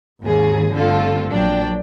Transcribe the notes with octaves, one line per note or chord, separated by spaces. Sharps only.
G#1 D#2 G#4
G1 D3 A3 C4 F4 A4
A#1 F#3 D4 G5